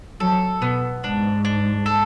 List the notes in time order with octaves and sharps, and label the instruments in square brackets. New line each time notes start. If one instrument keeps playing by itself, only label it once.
[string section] F#3 [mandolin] A4
[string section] B2 [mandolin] B3
[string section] G#2 [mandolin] D4
[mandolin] D4
A4